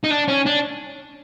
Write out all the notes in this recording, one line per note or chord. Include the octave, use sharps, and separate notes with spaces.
D#4
D4
C#4
D4